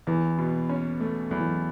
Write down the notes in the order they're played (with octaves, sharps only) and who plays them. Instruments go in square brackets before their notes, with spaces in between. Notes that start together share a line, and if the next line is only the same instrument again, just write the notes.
[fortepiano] E2 [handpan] E3
[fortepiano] B2
C#4
A3
[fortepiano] E2 [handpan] F#3
[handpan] E3
F#3